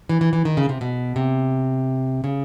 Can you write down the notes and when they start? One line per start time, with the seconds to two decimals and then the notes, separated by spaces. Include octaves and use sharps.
0.09 E3
0.21 E3
0.33 E3
0.45 D#3
0.57 C#3
0.69 C3
0.81 B2
1.16 C3
2.24 C#3